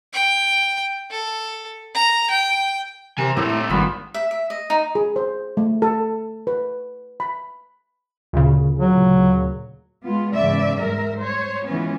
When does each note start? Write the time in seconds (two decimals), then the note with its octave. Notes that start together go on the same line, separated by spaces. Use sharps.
0.13 G5
1.11 A4
1.95 A#5
2.30 G5
3.18 C3 E3 A#4 C5 G#5
3.37 A2 A3 A#3 C4 G4 A4
3.49 D#4
3.70 G#1 G2 B3 F4 G#5 B5
4.14 E5
4.31 E5
4.50 D#5
4.70 D#4
4.95 G#4
5.16 C5
5.57 A3
5.82 A4
6.47 B4
7.20 B5
8.33 D2 A#2 C#3
8.79 F#3
10.04 G#3 B3 F4
10.35 E2 G#2 C#3 D5 E5
10.80 G#2 G3 A#4 E5
11.18 C5 C#5
11.67 E3 F3 G#3 B3 C#4